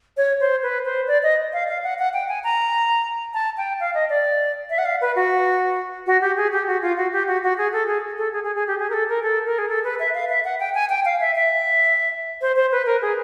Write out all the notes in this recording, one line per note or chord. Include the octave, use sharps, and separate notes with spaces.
C#5
C5
B4
C5
D5
D#5
F5
F5
F#5
F#5
G5
G#5
A#5
A5
G5
F5
D#5
D5
E5
F#5
F5
B4
F#4
F#4
G4
G#4
G4
F#4
F4
F#4
G4
F#4
F#4
G#4
A4
G#4
A4
G#4
G#4
G#4
G4
G#4
A#4
A4
A#4
A4
A#4
G#4
A4
B4
E5
F5
E5
F#5
G5
G#5
G5
F5
E5
E5
C5
C5
B4
A#4
G#4